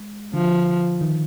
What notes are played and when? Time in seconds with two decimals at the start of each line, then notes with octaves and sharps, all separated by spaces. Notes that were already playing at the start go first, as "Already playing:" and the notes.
Already playing: G#3
0.34 D3 F3
1.01 D#3